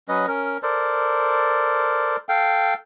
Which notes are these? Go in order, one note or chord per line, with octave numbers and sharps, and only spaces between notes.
F#3 C#4 B4 D#5
C#4 A#4
A4 A#4 C5 D5
A4 F5 G5